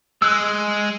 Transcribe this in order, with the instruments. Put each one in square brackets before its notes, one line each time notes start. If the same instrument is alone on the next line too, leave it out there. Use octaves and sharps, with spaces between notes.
[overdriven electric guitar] G#3 [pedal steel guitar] E6 F#6